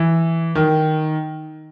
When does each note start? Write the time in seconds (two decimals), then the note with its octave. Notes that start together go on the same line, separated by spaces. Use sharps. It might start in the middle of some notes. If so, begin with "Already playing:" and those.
Already playing: E3
0.55 D#3